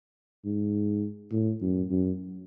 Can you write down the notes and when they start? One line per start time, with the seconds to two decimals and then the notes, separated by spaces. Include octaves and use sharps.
0.45 G#2
1.32 A2
1.61 F#2
1.91 F#2